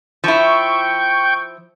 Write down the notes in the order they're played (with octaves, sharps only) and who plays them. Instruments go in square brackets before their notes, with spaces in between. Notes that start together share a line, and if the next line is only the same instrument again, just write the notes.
[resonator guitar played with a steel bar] F3 E4 [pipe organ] G5 C#6 G6